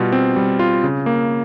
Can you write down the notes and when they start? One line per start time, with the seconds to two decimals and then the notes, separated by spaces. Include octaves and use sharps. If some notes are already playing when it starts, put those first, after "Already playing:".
Already playing: B2 G3 F4
0.12 C4
0.36 G3
0.59 F4
0.84 C#3
1.06 A#3